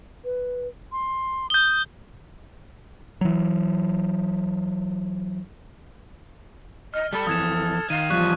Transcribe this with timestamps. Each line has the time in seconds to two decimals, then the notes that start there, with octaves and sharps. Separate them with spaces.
0.24 B4
0.92 C6
1.50 D#6 G6 G7
3.21 E3 F#3
6.94 D#5 F6
7.13 G3 A4 B5
7.27 F2 E3 D#6 G#6 E7
7.90 D#3 F5 D#7
8.10 E2 F3 G3 C#6 F#6